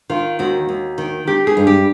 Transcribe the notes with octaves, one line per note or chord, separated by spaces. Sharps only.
D#3 F4
D#2 F#4
D#2
D#3
D#3 G4
G#4
G2
G4